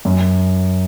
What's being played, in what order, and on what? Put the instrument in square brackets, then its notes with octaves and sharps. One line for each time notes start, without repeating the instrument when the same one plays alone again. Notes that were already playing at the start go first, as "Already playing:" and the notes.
[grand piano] F#2